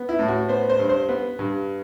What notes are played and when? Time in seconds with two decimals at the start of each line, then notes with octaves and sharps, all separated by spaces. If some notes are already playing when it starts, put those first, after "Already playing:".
Already playing: B3
0.09 E4
0.19 A2
0.28 F#4
0.49 B3 C5
0.69 C5
0.79 G2
0.89 C5
1.09 B3 B4
1.39 G2